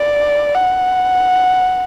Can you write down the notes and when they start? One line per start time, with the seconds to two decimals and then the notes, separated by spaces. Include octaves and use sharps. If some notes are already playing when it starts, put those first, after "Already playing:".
Already playing: D5
0.55 F#5